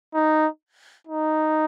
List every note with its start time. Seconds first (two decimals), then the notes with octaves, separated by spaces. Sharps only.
0.15 D#4
1.07 D#4